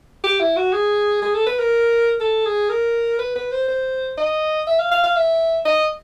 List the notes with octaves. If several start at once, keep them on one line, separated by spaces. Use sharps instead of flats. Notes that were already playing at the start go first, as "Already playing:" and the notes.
G4
E4
F#4
G#4
G#4
A4
B4
A#4
A4
G#4
A#4
B4
B4
C5
C5
D#5
E5
F5
F5
F5
E5
D#5